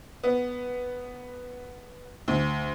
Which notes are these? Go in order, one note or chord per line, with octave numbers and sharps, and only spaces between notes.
B3
D2